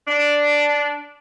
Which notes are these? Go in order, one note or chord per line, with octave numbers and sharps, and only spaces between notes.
D4